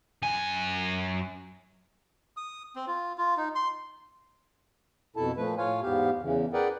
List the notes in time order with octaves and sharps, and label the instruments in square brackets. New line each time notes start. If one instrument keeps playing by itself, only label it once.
[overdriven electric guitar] F#2 G#5
[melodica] D#6
C4
F4
F4
D#4
C6
[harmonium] F2 B2 E4 A4 A5
A#2 F3 A3 B4
A2 F4 C#5 F5 G#5
E2 G#2 B3 G4 F5
E2 C#3 E3
G#4 A#4 B4 D5 F#5 G5